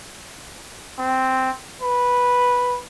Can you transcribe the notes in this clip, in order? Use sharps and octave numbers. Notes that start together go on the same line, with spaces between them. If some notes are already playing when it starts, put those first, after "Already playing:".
C4
B4